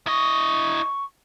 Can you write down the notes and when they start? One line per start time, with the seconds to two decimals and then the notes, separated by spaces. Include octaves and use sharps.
0.07 E4 D#5 C#6